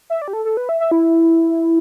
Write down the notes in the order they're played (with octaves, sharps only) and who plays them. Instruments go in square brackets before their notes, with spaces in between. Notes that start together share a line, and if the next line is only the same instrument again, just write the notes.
[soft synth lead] E5
D5
G4
A4
A4
B4
E5
E5
E4